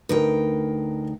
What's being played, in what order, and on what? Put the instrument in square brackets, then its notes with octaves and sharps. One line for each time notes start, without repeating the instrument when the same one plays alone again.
[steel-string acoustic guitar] D2 D#4 G5 [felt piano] A#4 B4